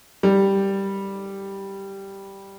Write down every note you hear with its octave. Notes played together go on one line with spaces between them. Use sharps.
G3